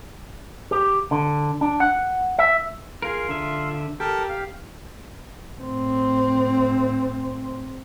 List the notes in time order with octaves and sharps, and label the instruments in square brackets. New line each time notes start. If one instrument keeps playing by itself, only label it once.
[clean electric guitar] G4
D3
D4
F#5
E5
[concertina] F4 [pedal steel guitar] G#4 A#4
[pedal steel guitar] D3 E5
[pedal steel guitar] G4 [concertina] A4 A#4
[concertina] F5
[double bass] A2 C4